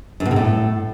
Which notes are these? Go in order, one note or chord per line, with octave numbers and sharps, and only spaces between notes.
F#2
B2
C3
A2